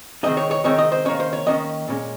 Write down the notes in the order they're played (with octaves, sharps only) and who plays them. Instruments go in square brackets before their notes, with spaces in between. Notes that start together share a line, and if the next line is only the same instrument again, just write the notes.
[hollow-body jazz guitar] D#3 G#3 C4 D#4 D#5
C#5
C#5
D#3 G#3 C4 D#4 C#5
D#5
C5
D#3 A#3 C#4 C#5
C5
C#5
D#3 A#3 C#4 D#5
A#2 G#3 C#4